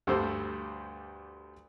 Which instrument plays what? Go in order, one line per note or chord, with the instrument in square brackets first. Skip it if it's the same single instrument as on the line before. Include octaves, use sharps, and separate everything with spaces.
[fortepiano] D2 G2 G3 A3 C5 E6